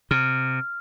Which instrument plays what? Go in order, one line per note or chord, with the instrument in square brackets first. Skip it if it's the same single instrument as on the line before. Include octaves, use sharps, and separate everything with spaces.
[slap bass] C3 [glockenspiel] F6